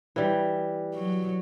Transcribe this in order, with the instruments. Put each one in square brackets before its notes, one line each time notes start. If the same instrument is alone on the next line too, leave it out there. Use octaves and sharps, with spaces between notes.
[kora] E3 G3
[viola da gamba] F#3